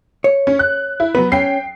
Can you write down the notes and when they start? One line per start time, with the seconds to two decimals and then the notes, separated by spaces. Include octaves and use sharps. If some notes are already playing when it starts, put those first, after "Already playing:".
0.24 C#5
0.47 C#4
0.59 F#6
1.00 E4
1.15 F#3 B3 B4
1.32 C#4 G5 C7